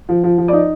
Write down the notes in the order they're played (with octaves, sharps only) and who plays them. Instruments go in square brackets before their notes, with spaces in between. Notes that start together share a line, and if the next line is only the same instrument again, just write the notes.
[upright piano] F3
F3
F3
D#4 D5